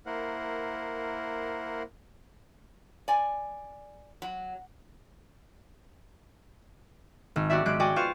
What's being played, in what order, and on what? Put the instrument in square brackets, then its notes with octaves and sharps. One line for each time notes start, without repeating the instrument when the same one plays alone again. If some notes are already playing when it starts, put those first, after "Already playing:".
[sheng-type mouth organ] A#3 E4 A#4 C5 F#5
[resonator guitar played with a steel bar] D5 G#5
F#3
[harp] G#1
B3 F#4 G4 D5 E5
G#1 G#3 G4 F#6 D7
F#4 D5 G5 G#5 D6
F4 B4 C5 F5 C#6